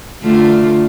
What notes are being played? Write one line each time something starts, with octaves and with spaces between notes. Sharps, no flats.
D3 A3 F4